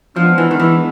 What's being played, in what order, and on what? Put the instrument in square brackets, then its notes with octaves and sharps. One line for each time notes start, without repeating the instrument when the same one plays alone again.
[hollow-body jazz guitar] F3 [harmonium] G#3 B3 D4
[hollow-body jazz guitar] E3
D#3
E3